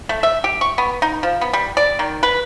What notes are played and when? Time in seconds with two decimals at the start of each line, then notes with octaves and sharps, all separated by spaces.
0.09 A3
0.23 E5
0.44 G4
0.61 C#6
0.78 B3
1.02 D#4
1.23 F3
1.41 B3
1.53 G3
1.77 D5
1.99 D#3
2.23 B4